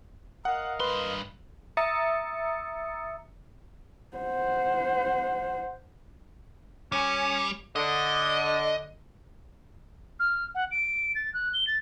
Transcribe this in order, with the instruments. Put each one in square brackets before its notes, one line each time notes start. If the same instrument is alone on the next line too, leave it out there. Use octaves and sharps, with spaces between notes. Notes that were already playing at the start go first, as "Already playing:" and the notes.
[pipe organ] A#4 D#5 F5 [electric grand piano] F#5
[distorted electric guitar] G2 C6 [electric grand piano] B4
[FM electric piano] E5 A#5 D#6 E6 A6 C#7
[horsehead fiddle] C5 F#5
[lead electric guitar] G3 [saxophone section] C#4
[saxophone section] D3 [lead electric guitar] D#5
[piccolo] F6
F#5
D7
A6
F#6
G7
A6